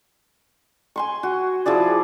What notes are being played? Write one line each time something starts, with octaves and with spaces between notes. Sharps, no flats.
G#5 C6 C#6
F#4
F3 E4 G#4 D5